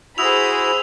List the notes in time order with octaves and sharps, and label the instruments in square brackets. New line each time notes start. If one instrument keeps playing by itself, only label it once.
[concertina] E4 F#4 [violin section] G#4 C5 B5 [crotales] D#6 E6 F7